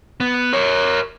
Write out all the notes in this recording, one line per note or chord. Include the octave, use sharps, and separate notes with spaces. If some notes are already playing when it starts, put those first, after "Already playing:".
B3
A#4 C#5